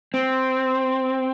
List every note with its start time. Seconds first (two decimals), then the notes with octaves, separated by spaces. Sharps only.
0.14 C4